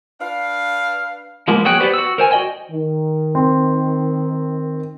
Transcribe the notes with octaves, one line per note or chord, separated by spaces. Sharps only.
D4 B4 F5
F3 G#3 A#3 B3
F#3 F#4 G#4 G5 F#6
B3 G4 B4 C5 D5
F#4 E6
A#4 C5 G#5
F#4 D5 D#5 G5 G#5
D#3
C4